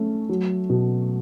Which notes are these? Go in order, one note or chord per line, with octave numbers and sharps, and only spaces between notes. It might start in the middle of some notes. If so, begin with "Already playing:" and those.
Already playing: A3 C#4
F#3
B2